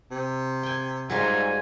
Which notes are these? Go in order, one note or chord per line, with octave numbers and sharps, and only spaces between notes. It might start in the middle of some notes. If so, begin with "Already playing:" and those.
C3
G5 G#5
G#2 F#3 G3 F4 G#5